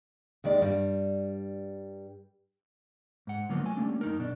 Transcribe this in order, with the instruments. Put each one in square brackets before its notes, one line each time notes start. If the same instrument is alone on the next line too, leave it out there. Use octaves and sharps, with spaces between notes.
[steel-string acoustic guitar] D#2 D#3 G#3 D5
G2 G3
[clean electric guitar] G#2 F#5
D3 F3 F#3 A#3 B3
A3 G#5
G3 A3 A#3 C#4 D4
F#2 D#4 A#4
B2 D4